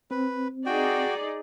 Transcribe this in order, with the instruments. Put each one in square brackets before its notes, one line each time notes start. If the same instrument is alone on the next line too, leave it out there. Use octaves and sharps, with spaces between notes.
[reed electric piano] C4 [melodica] B4
[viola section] D#4 G#4 D5 [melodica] F#4 G5